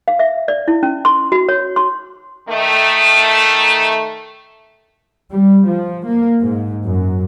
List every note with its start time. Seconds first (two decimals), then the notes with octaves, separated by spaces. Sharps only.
0.08 F5
0.19 E5
0.48 D5
0.68 E4
0.83 C#4
1.05 C6
1.32 F#4
1.49 C#5
1.76 C6
2.48 D#3 A3
5.30 G3
5.67 F3
6.05 A#3
6.41 G#2
6.85 F#2